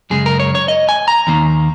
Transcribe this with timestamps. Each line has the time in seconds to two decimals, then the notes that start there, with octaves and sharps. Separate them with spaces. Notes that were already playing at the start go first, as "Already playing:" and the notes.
0.10 F#2 C#3 G#3 G#4
0.26 A#4
0.40 C#5
0.55 C#5
0.68 D#5
0.89 G#5
1.08 A#5
1.27 D#2 D#3 A#3